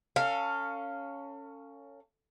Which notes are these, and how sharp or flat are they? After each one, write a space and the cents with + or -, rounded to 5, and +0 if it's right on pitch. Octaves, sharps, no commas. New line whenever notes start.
C#4 +5 A4 +35 F5 +0